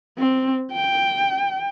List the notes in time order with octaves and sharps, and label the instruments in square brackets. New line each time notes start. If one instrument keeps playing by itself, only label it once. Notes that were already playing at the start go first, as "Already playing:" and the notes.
[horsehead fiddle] C4
G5